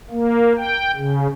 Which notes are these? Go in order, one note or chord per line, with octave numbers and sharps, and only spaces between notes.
A#3
G5
C#3